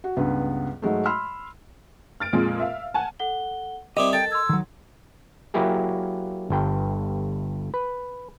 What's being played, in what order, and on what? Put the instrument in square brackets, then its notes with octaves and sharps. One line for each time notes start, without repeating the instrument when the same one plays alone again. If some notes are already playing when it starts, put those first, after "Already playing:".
[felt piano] F#4
C#2 G2 B3 B4
G#2 F#3 G#3 A3
B5 C6 E6 F6
[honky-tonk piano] F6 A6 D7
F2 A#2 G#3
E5 F5
F#5 G#5 A5
[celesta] A4 F#5 G7
[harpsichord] G3 C4 E4 [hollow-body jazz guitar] A#4 D#5 [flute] D6 [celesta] D#6
[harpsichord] A4 [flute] G5 [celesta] A6
[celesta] C6 G#6 [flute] E6
[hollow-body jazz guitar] D#3 F#3
[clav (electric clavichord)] F#3 A#3 E4 G4 G#4
G1 G2 G5
B4